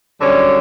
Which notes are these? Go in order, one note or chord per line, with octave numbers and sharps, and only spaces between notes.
F#2 D3 G3 C#4 C#5